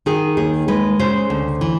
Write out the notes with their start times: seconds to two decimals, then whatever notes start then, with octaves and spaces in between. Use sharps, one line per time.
0.06 D#3 G#4
0.37 D#2 G#4
0.68 G#3 B4
0.99 C#3 C5
1.30 D2
1.61 E3